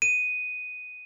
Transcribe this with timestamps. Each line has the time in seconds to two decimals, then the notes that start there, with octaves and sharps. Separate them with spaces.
0.02 D#7